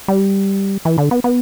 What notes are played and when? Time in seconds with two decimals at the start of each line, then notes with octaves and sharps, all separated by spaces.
0.08 G3
0.85 E3
0.98 D3
1.11 B3
1.24 B3